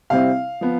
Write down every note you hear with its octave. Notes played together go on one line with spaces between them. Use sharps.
C3 G3 C4 E4 F5
F3 B3